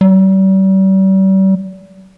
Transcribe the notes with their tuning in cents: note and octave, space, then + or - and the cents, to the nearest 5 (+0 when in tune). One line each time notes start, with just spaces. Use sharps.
G3 -40